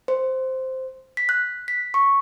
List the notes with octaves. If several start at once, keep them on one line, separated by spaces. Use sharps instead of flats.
C5
B6
F#6
B6
C#6